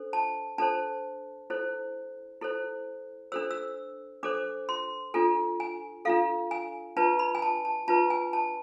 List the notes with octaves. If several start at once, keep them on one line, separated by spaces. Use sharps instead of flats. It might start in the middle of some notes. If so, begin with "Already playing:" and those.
Already playing: D4 A4 C5
A5
D4 A4 C5 A5
E4 A4 C5
E4 A4 C5
D4 A4 C5 E6
E6
D4 A4 C5 D6
C6
D4 F4 A4 G#5
G#5
D4 F4 A4 F5
G#5
D4 F4 B4 A5
B5
G#5
A5
A5
D4 F4 B4 A5
G#5
A5